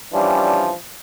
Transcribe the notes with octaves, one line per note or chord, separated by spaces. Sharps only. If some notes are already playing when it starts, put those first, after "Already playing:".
E3 F3 G3 C#4 D4